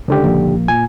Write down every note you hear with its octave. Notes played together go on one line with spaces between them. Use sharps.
C#2 D3 G4
A#1 F3 A#3
A#2 G#5